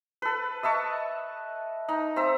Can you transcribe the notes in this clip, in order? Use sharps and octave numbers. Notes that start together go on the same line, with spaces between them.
A4 B4
D#5 E5 A5 C#6
D#4
C4 E5 A#5